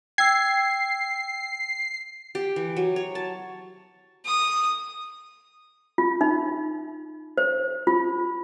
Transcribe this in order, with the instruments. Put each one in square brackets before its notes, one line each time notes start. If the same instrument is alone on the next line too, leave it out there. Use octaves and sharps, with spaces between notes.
[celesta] G5 E6 [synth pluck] G#6 [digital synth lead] C7
[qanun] G4
E3
F#3
C#5
A5
[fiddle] D#6
[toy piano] F4
D#4
C5
F4